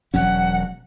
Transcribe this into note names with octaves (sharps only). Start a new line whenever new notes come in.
E1 F#3 C#4 F#5